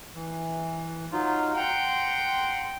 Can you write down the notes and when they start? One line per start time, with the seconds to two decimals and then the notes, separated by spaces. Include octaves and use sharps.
0.15 E3
1.12 F#3 D#4 F4
1.56 F#5 G5 A#5 C6